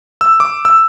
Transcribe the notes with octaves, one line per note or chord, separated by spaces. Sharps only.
E6
D6
E6